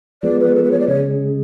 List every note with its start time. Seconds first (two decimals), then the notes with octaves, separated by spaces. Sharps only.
0.23 F3 G#3 B3 D5
0.40 B4
0.55 A4
0.64 B4
0.71 C#5
0.80 D5
0.88 C#3 G#3 C#5